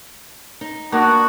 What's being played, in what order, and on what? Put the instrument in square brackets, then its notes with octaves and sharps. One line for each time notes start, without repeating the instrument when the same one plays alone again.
[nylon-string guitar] D#4
[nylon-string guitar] A#3 [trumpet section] B3 D4 F#4